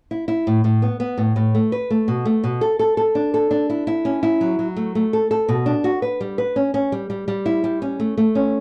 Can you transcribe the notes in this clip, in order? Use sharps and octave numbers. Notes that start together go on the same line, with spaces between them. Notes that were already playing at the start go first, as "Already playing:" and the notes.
E4
E4
A2
A2
B3
B3
A2
A2
A3
B4
A3
B2
A3
B2
A4
A4
A4
D4
A4
D4
E4
E4
C#4
E4
F#3
F#3
A3
A3
A4
A4
B2
D4
F#4
B4
G3
B4
C#4
C#4
G3
G3
G3
E4
G3
C#4
A3
A3
C#4